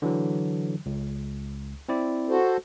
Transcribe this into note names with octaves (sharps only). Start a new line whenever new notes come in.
D3 E3 F#3
C#2
C4 E4 D5
F#4 A4 C5